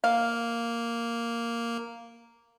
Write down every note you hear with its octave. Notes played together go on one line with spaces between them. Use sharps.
A#3 F5